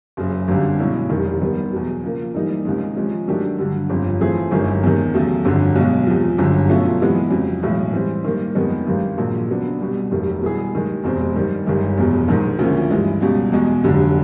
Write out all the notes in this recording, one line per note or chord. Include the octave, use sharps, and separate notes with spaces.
F#1 F#2 C#3
G#1 F#2 D3 G3
B1 B2 G#3 C#4 E4
F1 D#2 D#3
D#3 G3 B3
E2 B2 F#3
C#3 F3 A#3
G#2 E3 G3 A#3 D#4
C#2 C3 D#3 G#3
C3 F3 G#3 C#4
D#3 F#3 A3 D4 G4
G2 D3 F#3
G1 F2 C#3 F3
E3 A3 C4 F4 G#4
G1 F#2 D#3 G#3 C#4
E2 C3 D#3
E2 C#3 F#3 A3
G1 F2 D3 F#3
B1 B2 G#3
E2 C3 F3
G1 F#2 D3
B2 F#3 A3 C#4 F4
C3 E3 G#3 B3
F2 C#3 F#3
B1 A2 E3 G#3
E3 G3 C4
D#3 G3 A#3
F2 C3 D#3 G#3 B3
G#1 G2 D#3
A#1 A#2 F#3 A#3
C#3 F#3 B3 D4
C2 B2 G3
F1 D#2 D#3 F#3 A3
B2 G3 B3 E4 G#4
D#2 D#3 G#3
F1 E2 B2 G#3 C4
G2 D#3 G3
G1 G2 D#3 G#3
F1 E2 B2
A#1 G#2 D#3
D2 C#3 F3 A#3 C#4
G2 E3 G#3
C#2 B2 G3
E2 B2 G#3
F1 D#2 D3 F#3